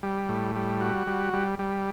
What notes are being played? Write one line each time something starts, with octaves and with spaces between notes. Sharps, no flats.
G3
A2
G3
F#4
G3
G3
G3